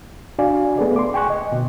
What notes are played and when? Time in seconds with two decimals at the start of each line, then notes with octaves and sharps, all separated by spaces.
0.39 D4 F#4 D5 F5 G#5
0.78 A3 B3 G#4 A4 D5
0.96 C6 D6
1.14 G5 G#5 C#6 F#6
1.30 D#5
1.51 B2 D3